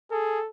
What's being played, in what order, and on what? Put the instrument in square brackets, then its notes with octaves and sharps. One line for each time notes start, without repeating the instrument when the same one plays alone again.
[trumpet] G#4 [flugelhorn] A4